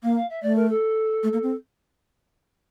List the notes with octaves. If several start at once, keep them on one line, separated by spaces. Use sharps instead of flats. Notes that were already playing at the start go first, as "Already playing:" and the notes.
A#3 F5
F5
E5
A3 D5
A#4
A4
A3
A#3
C4